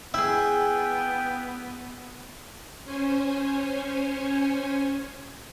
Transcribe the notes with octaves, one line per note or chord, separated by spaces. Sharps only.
B3 E4 G#4 E5 G5
C#4 C5 C#5 G#5